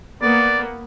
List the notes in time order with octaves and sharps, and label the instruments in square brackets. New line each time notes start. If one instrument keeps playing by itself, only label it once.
[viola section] A#3 B3 [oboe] D5